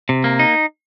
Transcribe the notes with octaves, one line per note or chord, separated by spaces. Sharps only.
C3
A#3
D#4